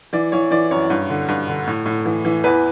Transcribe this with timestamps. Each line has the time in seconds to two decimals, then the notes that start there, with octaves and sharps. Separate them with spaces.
0.13 E3 D5
0.32 E3 C#5
0.51 E3 D5
0.71 F#2 C#5
0.90 G2
1.10 D3
1.28 G2
1.48 D3
1.67 A2
1.86 A2
2.05 E3
2.25 E3
2.44 E2 B4